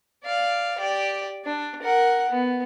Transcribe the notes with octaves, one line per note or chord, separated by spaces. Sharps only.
D5 F5
G4 D5
D4
A#4 F#5
B3